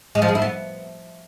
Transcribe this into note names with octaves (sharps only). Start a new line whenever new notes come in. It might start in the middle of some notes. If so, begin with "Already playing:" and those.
G#3
F3
G#4
E4
B3